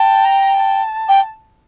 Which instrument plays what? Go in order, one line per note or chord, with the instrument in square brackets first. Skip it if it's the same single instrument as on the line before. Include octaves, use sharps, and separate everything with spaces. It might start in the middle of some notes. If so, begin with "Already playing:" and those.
Already playing: [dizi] G5 [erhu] A5
[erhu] A#5
A5
[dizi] G5